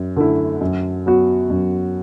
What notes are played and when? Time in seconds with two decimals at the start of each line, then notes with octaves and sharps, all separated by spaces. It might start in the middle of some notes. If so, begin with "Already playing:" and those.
Already playing: F#2
0.17 D3 A3 E4
0.61 F#2
1.06 F#3 B3 F#4
1.50 F#2